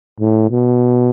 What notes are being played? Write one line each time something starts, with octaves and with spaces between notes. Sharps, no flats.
A2
B2